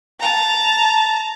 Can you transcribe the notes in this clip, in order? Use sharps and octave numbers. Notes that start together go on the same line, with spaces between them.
A5 A#5